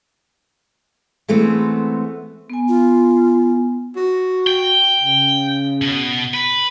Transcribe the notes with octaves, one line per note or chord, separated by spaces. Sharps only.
E3 G#3 A3 B3 C4
B3 G#5
F4
F#4
G5
C#3
B2
B4